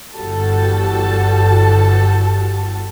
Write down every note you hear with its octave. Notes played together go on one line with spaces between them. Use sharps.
G1 E3 G3 F#4 A4 A5